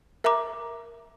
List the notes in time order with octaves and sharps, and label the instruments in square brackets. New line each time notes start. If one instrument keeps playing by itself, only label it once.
[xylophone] A#4 E5 A#5 D6